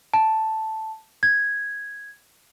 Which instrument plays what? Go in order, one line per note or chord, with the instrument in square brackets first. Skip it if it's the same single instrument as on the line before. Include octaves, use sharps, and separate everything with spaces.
[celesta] A5
G#6